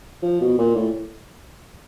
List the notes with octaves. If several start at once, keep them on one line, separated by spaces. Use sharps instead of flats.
F3
B2
A#2
A2